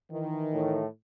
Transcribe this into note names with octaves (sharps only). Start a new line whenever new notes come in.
D#3 E3
A2